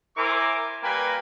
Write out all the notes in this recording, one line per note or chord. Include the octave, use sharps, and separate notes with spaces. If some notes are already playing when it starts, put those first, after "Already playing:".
E4 A#4 C5 G#5 D6
G3 A#3 A#4 B4 G5 G#5